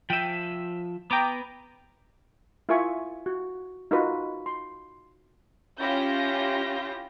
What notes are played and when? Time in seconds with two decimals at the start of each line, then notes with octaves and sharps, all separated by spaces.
0.10 F3 E5 G5 D#7
1.11 B3 G5 A#5 D6
2.69 E4 F4 A#4 E5 G#5 C#6
3.26 F#4
3.91 D#4 F4 F#4 A#4 B4
4.46 C6
5.81 C#4 E4 F4 G4 G6 A#6